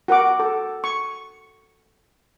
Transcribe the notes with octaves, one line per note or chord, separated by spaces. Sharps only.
F#4 A#4 F#5 D6
A4
C#6